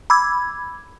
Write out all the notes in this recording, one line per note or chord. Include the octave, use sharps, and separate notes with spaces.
B5 D6 E6 G#6